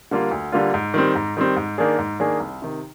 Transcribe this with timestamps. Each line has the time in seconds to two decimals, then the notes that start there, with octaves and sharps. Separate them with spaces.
0.11 D3 G3 A#3 F4
0.31 D2
0.52 D3 G3 A#3 F4
0.74 G#2
0.94 D#3 G3 C4
1.15 G#2
1.37 D#3 G3 C4
1.56 G#2
1.78 D#3 A#3 D4 G#4
1.98 G#2
2.20 D#3 A#3 D4 G#4
2.40 C2
2.62 C3 D#3